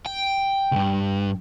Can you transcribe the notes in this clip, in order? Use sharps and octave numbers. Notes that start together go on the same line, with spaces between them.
G5
C#2 G2